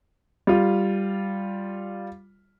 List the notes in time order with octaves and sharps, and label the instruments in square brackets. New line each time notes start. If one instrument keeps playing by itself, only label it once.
[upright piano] G3 F4